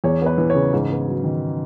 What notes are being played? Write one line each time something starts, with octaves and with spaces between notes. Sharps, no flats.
E2 C#5
B3 B4
E3
C#5
C#3
G#2
B3
F#3
D#3